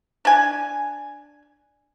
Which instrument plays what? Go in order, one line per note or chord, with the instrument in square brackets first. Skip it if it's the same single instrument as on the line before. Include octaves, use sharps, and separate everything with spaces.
[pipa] D4 G#5